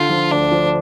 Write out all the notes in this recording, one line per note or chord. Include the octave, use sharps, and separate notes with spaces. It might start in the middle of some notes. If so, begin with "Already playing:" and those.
Already playing: D3 F4
F3
D2 D4
F3